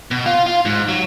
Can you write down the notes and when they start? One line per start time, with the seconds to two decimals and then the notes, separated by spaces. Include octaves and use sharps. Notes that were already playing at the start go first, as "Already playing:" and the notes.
0.11 B2
0.26 F4
0.46 F4
0.65 G#2
0.89 F#3